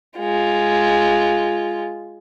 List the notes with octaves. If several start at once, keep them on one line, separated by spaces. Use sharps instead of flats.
G#3 F4